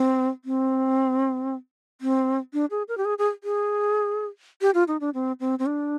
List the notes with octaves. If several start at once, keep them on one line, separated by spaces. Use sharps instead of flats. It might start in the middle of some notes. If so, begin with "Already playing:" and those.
Already playing: C4
C4
C4
D4
G#4
A#4
G4
G#4
G#4
G#4
G4
F4
D#4
D4
C4
C4
C4
D4